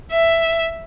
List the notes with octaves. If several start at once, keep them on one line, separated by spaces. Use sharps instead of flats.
E5